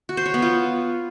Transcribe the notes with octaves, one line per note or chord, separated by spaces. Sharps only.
F#4
C5
C#5
B3
F4